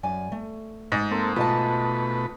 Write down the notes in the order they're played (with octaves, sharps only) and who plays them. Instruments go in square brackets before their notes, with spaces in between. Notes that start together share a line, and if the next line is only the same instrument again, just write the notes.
[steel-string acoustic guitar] F#2 D5 G#5
A3
[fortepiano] G#2
[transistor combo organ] A#3 C4 A4
[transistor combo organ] B2 A3 B4 [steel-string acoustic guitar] F4 D#5 A5